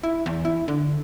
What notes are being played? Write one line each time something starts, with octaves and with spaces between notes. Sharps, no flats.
E4
E2
E4
D3